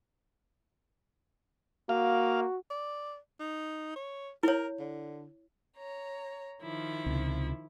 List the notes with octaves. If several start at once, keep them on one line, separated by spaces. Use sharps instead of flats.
A#3 F#4 F5
D5
D#4
C#5
E4 A#4 C#5
D3
C#5 A#5
D#3 F3 E4
C#2 C3